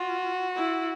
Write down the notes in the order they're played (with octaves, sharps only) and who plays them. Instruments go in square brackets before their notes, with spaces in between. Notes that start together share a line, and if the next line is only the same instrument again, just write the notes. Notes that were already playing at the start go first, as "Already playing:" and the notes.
Already playing: [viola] F4 [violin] F#4
[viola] E4